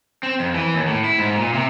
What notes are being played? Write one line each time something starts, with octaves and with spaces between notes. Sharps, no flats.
C4
F2
E3
D#2
A2
E4
G#2
A#2
C3